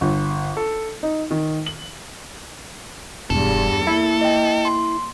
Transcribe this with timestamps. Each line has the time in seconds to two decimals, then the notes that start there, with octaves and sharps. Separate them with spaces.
0.01 G1
0.57 A4
1.03 D#4
1.31 D#3
1.66 F#7
3.30 E1 E2 G2 A4
3.87 A#3 E4
4.21 D#5 G5
4.65 C6